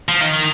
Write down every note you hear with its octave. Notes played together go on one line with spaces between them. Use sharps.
F3
D#3